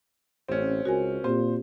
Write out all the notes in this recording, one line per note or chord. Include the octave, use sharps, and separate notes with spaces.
A1 C4 C#4
C#2 F#4 A#4 G#5
A#2 C4 G4 C5